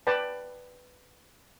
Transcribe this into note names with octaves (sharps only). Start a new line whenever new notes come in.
B4 D5 G5 A5